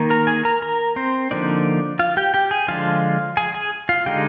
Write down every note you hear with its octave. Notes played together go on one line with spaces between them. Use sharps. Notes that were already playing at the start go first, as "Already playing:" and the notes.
Already playing: D#3 A#3 D#4
A#4 A#5
G#4 G#5
A#4 A#5
A#4 A#5
C4 C5
D3 F3 A#3 D4 D#4 D5
F4 F5
G4 G5
G4 G5
G#4 G#5
D3 F3 G#3 D4 F4 F5
G#4 G#5
G#4 G#5
F4 F5
D3 G#3 D#4 G4 G5